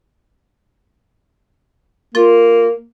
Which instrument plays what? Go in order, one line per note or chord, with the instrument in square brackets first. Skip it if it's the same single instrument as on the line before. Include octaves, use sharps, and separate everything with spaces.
[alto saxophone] A#3 [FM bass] F4